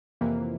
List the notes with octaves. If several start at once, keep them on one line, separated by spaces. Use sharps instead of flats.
F2 C3 E3 A#3